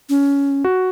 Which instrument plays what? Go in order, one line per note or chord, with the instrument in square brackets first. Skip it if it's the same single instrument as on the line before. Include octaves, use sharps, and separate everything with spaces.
[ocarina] C#4
[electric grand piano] F#4